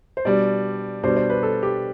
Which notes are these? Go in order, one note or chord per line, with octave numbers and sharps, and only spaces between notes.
C5
B2 G3 D4 D5
B2 G3 D4 C5
C5
B4
A4
G4